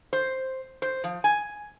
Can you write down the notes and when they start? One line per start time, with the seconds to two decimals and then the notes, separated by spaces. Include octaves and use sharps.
0.13 C5
0.82 C5
1.04 F3
1.24 G#5